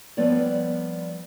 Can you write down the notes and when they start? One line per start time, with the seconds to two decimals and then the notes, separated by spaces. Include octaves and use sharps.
0.17 F3 G3 B3 A4 C#5 D5